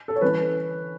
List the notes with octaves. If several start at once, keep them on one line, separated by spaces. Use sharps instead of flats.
A4
C#5
E3 C#4 B4